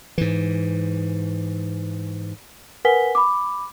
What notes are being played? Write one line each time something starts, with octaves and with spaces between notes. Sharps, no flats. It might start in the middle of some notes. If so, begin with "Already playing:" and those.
G#2 E3
A#4 B4 F#5 G#5 B6 G7
B5 D6